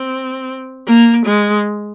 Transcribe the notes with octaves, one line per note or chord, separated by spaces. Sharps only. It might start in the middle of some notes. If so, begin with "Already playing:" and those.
Already playing: C4
A#3
G#3